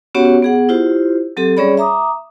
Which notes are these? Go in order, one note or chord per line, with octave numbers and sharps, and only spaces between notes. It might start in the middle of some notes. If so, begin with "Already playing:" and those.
B3 C#4 F#4 G4 C#5 F#5
B3 G#4 F#5
E4 F4 G4 C5
F#3 C4 G4 A4
G3 C#4 G#4 C#5 D5 B5
E5 A#5 D6 D#6